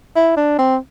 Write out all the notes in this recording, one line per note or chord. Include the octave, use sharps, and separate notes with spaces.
E4
D4
C4